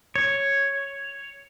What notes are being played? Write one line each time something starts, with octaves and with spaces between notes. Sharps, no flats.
C#5